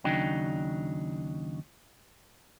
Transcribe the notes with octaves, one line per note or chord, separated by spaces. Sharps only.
D#2 C#3 F#3 D4 D#4 G5